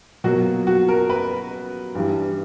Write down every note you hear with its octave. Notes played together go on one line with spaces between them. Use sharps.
B2 F#3 A#3 F#4
F#4
A#4
B4
G2 E3 G3